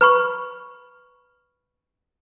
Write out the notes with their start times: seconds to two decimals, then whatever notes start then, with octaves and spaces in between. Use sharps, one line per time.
0.01 B4 B5 C#6